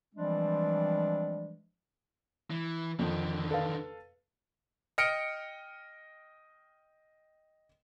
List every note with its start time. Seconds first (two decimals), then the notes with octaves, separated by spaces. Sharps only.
0.15 E3 F3 G3 G#3 C4 D4
2.51 E3
2.99 F2 D3 D#3
3.51 A4 B4 F5
4.98 D#5 G5 F6 C#7 D7